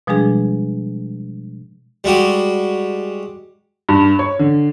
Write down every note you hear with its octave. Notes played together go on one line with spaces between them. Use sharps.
B2 F3 G3 G#3 D4 G#4
G3 G#3 F#4 G4
G2
C#5
D3